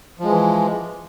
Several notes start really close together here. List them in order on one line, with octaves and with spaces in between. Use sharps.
F3 G#3 E3